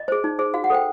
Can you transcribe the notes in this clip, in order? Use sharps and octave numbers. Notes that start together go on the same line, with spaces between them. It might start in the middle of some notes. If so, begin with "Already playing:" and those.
Already playing: D#5
G#4 C5
D#4
G#4 C5
F#4 F5
F#5
A4 C5 G5